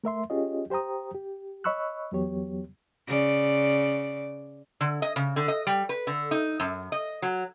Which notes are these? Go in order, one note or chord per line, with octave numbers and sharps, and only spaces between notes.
A3 A#4 E5 C6
C#4 F4 G4 G#4 C#5 D#5
G4 C5 G5 A#5 D#6
G4
C#5 D#5 B5 C#6 E6 F#6
E2 F#3 B3 G4 C#5
C#3 D5
D3
D#5
C#3
D3
D#5
G3
B4
D3
D#4
F#2
D#5
F#3